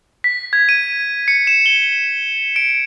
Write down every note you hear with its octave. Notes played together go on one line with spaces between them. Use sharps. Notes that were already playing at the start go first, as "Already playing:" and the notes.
B6
G#6
D#7
C#7
E7
G7
D7